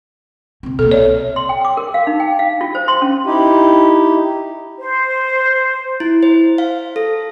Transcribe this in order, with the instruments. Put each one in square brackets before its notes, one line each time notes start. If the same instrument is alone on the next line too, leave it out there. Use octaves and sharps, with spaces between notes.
[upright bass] C2 C4
[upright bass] B2 A#3 [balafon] A4
[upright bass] C2 [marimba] C#5 [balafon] D5 E5
[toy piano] C6
G5
D6
A#4
F5
D#4
G5
F5
F4
C5
C6
C#4
[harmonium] D#4 E4 G4
[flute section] C5
[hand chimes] E4
C5
F5
A4